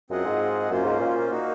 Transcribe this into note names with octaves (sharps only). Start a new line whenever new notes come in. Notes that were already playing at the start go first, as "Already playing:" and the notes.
F#2 C4 F4 G#4 D#5 F#5
G#2
F#2 A#3 C#4 F4 C5
G#2
A#2
A#3 D#4 F#4